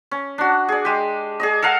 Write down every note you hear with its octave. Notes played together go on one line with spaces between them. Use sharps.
C#4
D4 F#4
G#4 D5
G#3 G4
G#4 D5 D#5
A4 A#4 F5 F#5